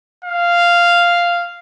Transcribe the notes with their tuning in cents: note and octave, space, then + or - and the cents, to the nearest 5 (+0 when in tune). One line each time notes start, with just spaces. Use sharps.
F5 -5